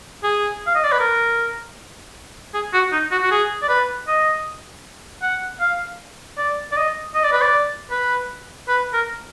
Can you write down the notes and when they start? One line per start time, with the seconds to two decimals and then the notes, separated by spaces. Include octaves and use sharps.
0.23 G#4
0.67 F5
0.75 D#5
0.84 D5
0.92 B4
1.00 A#4
2.54 G#4
2.73 F#4
2.92 D#4
3.11 F#4
3.22 F#4
3.31 G#4
3.62 D5
3.69 B4
4.08 D#5
5.22 F#5
5.61 F5
6.38 D5
6.72 D5
6.77 D#5
7.15 D#5
7.24 D5
7.33 B4
7.42 D5
7.91 B4
8.69 B4
8.93 A#4